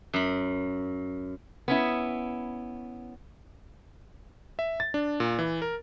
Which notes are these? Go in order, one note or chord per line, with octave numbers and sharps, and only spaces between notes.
F#2 B5
B3 C#4 E4
E5
A6
D4
A#2
E3
A#4